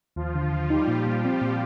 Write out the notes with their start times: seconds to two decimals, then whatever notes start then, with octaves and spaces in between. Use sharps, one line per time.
0.16 D#2 F3 F4
0.35 D3
0.52 D#2
0.70 G3 D#4 G4
0.88 A#2
1.07 A#2
1.24 C4
1.42 A#2